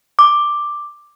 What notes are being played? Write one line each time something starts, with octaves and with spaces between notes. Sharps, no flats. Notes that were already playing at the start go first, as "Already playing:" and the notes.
D6